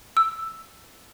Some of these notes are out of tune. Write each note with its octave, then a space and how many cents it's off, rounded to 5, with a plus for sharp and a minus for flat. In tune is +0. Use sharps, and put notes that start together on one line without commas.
E6 +5